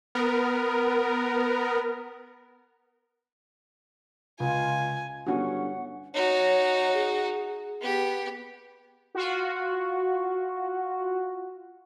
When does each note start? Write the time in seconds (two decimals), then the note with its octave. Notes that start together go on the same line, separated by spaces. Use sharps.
0.15 B3 A#4
4.40 C#2 F4 G#5
5.27 G1 C#4 F#4 F#5
6.14 D#4 F#4 C#5
6.93 G#4
7.81 B3 G4
9.15 F4 F#4